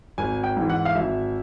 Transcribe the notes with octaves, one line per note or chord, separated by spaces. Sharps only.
G#1 G#5
G5
G#2 E3
F#5
F5
G#1 E5